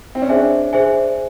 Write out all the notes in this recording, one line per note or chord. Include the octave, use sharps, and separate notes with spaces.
C4
C#4
D4 G#4 C5 E5 G#5
G#4 C5 E5 G#5